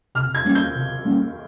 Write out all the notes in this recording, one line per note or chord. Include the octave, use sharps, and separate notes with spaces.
C3 F6
G#6
G3 A#3 C#4
G6
C3
G3 A#3 C#4